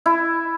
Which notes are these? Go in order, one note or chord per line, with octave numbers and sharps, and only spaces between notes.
E4